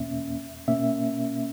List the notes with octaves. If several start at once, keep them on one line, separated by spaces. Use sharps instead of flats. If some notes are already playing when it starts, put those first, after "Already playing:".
Already playing: E2 B2 A#3 C#4 E5
B2 A#3 C#4 E5